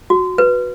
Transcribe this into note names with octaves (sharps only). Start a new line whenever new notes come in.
F#4
B4